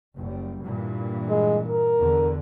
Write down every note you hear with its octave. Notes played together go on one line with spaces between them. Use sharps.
F#1 G3
G2 A#2 E3
G#3
A#4
E2 D3